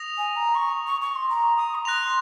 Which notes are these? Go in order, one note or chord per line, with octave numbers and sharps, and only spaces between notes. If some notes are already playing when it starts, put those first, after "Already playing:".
Already playing: D#6 A#6 F7
G#5
A#5
C#6
C#6
C#6
C6
A#5
D#6
A#5
C6 F#6 A#6 F7